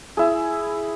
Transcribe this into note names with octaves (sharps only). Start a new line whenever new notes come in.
E4 G#4